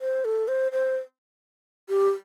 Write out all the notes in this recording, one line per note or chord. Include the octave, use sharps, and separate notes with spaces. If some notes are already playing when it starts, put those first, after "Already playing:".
C5
A4
C5
C5
G4